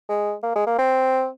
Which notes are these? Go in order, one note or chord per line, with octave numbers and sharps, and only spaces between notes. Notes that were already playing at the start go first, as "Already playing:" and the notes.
G#3
A#3
G#3
A#3
C4